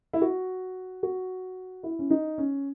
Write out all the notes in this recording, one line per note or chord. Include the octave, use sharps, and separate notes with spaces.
E4
F#4
F#4
E4
C#4
D#4
C#4